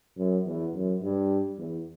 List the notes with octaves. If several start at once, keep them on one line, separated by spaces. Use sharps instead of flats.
F#2
E2
F#2
G2
E2